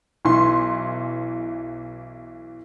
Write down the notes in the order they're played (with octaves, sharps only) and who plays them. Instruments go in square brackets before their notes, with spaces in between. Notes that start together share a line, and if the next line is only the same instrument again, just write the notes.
[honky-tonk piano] B1 E3 C6